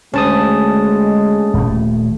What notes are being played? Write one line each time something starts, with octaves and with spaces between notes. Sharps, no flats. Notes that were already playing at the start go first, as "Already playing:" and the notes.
D2 G#3 C#4 A5 D#6
D#1 A3